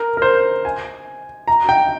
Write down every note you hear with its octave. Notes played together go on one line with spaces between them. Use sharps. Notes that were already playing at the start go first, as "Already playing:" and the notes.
Already playing: A#4
A#4
C5
G#5
A#5
G5